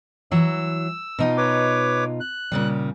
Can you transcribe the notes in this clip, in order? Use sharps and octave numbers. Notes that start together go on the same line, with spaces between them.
E3 F#3 E6
B2 D#4 F4
B4 C#5 D6
F#6
A#2 C#3 G3